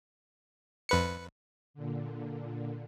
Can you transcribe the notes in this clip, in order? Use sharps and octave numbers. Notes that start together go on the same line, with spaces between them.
F2 B4 C#7
A#2 D3